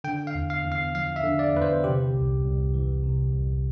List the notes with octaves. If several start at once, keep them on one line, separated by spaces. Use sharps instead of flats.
D3 G5
F5
E2
F5
E2
F5
F3 F5
E5
D3
D5
E2 B4
C5
C3 G4
C2
C2
E3
C3
C2